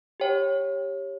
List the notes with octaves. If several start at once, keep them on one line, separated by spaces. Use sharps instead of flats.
G4 C#5 G5